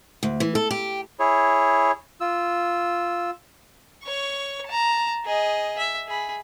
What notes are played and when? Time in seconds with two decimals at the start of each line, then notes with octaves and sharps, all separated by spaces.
0.23 D2
0.40 E3
0.55 A4
0.71 G4
1.20 E4 G#4 C#5
2.21 F4 E6
4.04 C#5 C#6
4.67 A5 A#5
5.26 G#4 D#5
5.78 E5
6.08 G#4 B5